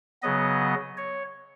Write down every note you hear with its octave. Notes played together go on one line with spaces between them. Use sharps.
C#3 F#3 B3 D#5
C#5